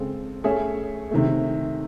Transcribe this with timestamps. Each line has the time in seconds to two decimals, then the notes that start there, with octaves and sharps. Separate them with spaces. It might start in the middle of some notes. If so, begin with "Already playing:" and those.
Already playing: C#3 G#3 C4 A4
0.44 A3 C#4 G#4 C#5 E5
1.11 C3 D#3 A3